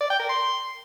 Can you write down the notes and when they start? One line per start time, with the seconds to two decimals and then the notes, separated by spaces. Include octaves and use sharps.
0.01 D5
0.10 G5
0.20 A#4
0.29 C6